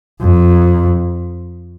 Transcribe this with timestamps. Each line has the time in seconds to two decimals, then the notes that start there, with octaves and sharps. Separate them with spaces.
0.21 F2